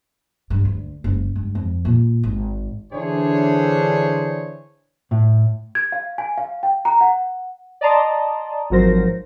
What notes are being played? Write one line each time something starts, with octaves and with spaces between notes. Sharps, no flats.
G2
D2
F#1
G2
F2
A#2
G#1
D3 E3 D4 G#4 C5 C#5
A2
G#6
F5
G#5
F5
G5
A#5
F#5
D5 D#5 A5 A#5 C6 D#6
G#1 F3 F#3 A#4 C5 A#6